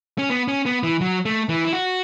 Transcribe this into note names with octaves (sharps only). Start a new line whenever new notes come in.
C#4
B3
C#4
B3
E3
F#3
A3
E3
E4
F#4